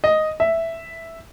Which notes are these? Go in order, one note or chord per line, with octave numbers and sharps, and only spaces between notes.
D#5
E5